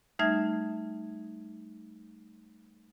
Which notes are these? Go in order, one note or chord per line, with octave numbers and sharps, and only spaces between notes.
G3 A3 D#4 E5 F6 G#6